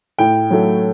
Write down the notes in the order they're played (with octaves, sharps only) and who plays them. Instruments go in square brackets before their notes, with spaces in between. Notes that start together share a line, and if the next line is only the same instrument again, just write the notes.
[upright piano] A2 G5
F#3 A3